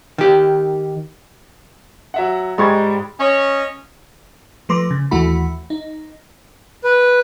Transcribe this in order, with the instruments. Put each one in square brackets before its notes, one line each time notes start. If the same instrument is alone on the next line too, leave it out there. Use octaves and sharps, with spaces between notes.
[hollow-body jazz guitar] D#3 G4
[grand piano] F#3 E5 F#5
[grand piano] G#2 C#6 G#6 [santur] G3 G#3
[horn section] C#4 C#5 D#5
[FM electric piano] F3 A3 B4 C6 D6 A#6
C#3
D#2 E3 A3 E4 F#4 B5
D#4
[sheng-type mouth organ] B4